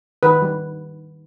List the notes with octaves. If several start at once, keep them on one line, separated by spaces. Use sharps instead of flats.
D#3 B4
G3